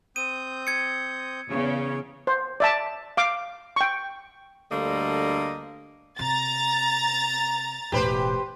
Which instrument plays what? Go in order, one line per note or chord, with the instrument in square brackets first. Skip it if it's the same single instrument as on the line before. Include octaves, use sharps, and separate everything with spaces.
[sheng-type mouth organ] C4 D#6 G6 [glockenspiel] D#7
[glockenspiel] G#6 C#7
[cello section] E2 C#3 [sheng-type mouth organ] C#5
[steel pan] C5
D5 E5 A5
F5 D6
G5 C#6
[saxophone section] D2 D3 G3 A#3 A4 D#5
[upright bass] C3 [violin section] A#5 A6
[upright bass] E1 A2 [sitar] G4 B4 C5